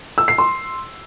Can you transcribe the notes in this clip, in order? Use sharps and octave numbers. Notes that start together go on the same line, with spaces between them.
E6
C7
C6